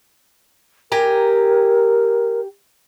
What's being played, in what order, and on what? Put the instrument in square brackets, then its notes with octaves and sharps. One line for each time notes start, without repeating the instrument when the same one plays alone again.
[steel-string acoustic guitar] G4 G#5 A#5 [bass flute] A#4